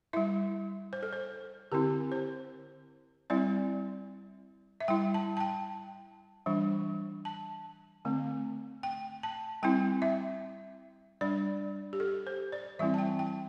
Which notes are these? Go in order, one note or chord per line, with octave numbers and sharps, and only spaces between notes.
G3 E4 E5
C5
A4
C5
D3 C4 E4 G4
C5
G3 C4 E4 D5
E5
G3 E4 G5
A5
A5
G5
E3 G3 D4
A5
D3 A3 C4
G5
A5
G3 C4 E4 G5
E5
G3 D4 D5
G4
A4
C5
D5
E3 G3 C4 E4 E5
A5
G5
G5